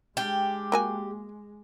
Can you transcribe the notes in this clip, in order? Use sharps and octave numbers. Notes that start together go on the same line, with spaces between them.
G#3 D4 G4 G5 F6
A#3 F#4 G#5